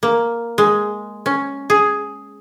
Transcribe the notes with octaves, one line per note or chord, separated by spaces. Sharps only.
A#3
G#3
C#4
G#4